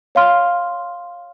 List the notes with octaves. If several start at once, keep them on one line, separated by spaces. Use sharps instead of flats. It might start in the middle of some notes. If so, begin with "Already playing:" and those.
C#5 F5 C6 F6